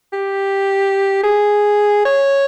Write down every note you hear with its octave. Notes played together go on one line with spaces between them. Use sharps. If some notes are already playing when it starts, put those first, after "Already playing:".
G4
G#4
C#5